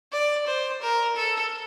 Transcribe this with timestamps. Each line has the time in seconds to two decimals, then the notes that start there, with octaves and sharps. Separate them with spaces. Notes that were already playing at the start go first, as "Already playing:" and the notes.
0.12 D5
0.47 C5
0.82 A#4
1.16 A4